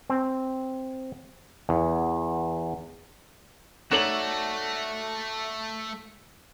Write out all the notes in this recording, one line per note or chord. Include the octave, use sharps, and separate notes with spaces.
C4
E2
A3 D#4 F#4 A4 C#5 D5 E7 F#7